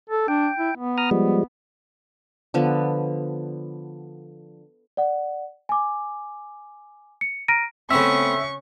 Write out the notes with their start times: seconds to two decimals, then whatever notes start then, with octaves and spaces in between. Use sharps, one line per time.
0.09 A4
0.28 D4 G5
0.59 E4
0.78 B3
0.98 A#5 D#6 F6
1.11 F3 G3 G#3
2.54 D3 F3 B3
4.97 D5 F#5
5.69 G#5 D6
7.21 C#7
7.48 A#5 F6 A#6 D7 D#7
7.91 C#3 A3 B3 C4 E5 C#6